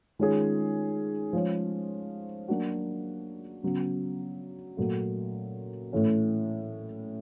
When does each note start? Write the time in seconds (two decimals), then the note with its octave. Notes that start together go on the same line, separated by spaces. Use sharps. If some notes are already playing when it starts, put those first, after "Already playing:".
0.19 D#3 G#3 C#4 F4 G#4
1.33 F3 G#3 C#4
2.48 F#3 A#3 D4 F#4
3.63 C#3 F#3 B3
4.77 A#2 F#3 A3
5.93 A2 E3 A3 C#4